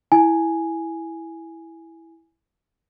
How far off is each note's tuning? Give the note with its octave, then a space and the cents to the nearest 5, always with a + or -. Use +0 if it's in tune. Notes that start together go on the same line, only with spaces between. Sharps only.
E4 +0 G#5 +0